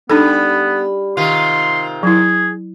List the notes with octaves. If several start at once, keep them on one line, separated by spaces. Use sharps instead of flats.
G3 B3 D4 D#4 A4
C3 D#3 F4 C6
F#3 E4 G#4